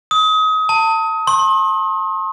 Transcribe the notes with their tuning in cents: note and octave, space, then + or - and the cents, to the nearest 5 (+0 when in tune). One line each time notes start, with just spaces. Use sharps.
D#6 +30
A5 +30
C6 +40